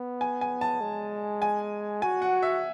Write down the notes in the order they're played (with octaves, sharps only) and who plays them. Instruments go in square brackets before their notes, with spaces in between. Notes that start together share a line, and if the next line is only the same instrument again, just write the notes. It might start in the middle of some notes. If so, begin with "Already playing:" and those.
Already playing: [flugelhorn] B3
[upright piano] G#5
G#5
A5
[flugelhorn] G#3
[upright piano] G#5
[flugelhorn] F#4 [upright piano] G#5
[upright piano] F#5
E5